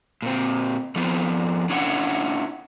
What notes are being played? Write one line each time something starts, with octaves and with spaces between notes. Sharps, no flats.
A#2 C4
F2 F3 B3 C4
C#4 D4 E4 C#5 F#5